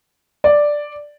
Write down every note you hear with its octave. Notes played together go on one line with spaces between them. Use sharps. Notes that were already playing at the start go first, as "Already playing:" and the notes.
D5